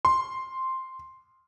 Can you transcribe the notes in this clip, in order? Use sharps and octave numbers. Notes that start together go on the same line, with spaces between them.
C6